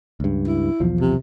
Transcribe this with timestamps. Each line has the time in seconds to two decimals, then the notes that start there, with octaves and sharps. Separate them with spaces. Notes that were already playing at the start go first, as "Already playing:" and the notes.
0.20 C#2 G2
0.47 E4
0.80 B1 E2 F3
1.00 C3